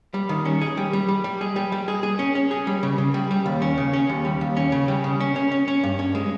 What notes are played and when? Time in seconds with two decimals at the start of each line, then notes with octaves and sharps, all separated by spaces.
0.14 G3
0.29 D#3
0.45 C#4
0.61 G#4
0.77 G3
0.93 G3
1.08 G3
1.24 G3
1.41 G#4
1.56 G3
1.72 G3
1.88 G#4
2.03 G#4
2.19 C#4
2.35 C#4
2.51 G#4
2.67 G3
2.83 C#3
2.98 C#3
3.14 G3
3.31 G3
3.46 D#2
3.62 C#4
3.78 C#3
3.93 C#4
4.09 D#2
4.25 G3
4.41 D#2
4.57 C#4
4.72 C#3
4.88 G3
5.04 C#3
5.20 C#4
5.36 C#4
5.52 C#4
5.68 C#4
5.83 G2
5.99 C#4
6.15 G#3